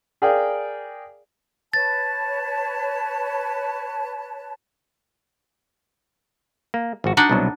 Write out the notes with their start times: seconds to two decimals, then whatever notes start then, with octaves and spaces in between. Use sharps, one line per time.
0.22 G#4 A#4 D5 F5 G5
1.73 B4 C#5 A5 A6
6.74 A#3
7.04 G#1 F3 F#4
7.17 D4 D#4 F#4 F#5
7.30 C2 B2 F#3